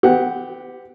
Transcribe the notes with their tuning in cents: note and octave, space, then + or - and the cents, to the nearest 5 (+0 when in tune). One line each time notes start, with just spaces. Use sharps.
B3 +45 G4 +0 F#5 +0